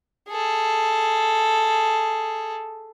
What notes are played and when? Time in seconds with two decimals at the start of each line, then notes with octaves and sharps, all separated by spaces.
0.29 G#4 A4